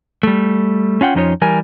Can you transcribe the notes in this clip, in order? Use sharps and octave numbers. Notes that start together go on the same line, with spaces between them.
G3 A3
C#4 F4 F#5 G5
F2 F3 C#4 D#4 F4 C#5
E3 G3 A#4 G#5